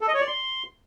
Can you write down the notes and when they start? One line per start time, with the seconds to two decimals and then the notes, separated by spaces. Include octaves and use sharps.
0.01 A4
0.08 D#5
0.14 C#5
0.21 D5
0.27 C6